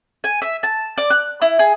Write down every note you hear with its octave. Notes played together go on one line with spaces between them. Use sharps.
G#5
E5
A5
D5
F#6
E4
G#4